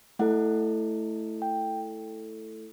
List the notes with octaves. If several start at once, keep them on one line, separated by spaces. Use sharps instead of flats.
A3 E4 A4 F#5
G5